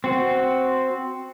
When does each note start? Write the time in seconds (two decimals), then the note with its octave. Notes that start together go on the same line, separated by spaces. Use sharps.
0.04 C4 F#4